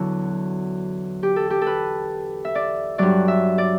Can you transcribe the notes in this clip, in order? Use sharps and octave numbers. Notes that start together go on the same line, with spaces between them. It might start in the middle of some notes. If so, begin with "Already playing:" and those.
Already playing: E2 D3 F#3 E4 F#4
G4
A4
G4
A4 B4
E5
D5
G2 F#3 D5
E5
D5